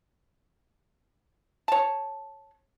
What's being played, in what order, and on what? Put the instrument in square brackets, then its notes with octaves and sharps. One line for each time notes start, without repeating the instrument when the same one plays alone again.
[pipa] C#5 A5